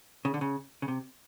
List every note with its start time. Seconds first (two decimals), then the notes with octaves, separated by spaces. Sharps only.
0.25 C#3
0.34 D3
0.41 C#3
0.82 C#3
0.88 C3